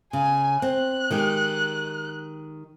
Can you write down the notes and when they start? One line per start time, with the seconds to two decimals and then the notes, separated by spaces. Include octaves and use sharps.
0.13 C#3 G#5
0.62 C4 F#6
1.11 D#3 G#3 G4